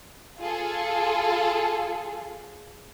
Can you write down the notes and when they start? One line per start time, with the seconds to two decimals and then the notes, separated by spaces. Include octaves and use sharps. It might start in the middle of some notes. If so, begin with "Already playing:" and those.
0.39 F4 G#4 A4